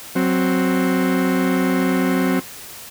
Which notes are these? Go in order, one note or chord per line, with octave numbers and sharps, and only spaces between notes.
F#3 C4